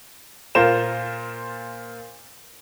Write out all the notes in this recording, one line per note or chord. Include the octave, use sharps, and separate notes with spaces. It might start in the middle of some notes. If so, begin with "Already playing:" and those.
A#2 F4 A#4 C5 E7